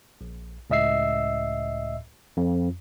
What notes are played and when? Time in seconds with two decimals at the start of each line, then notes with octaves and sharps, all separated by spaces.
0.21 A#1
0.70 C#2 A2 D#5 E5 E6 C7
2.37 F2